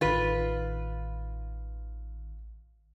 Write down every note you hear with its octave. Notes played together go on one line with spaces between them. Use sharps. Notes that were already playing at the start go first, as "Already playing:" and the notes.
A1 D#3 F4 B4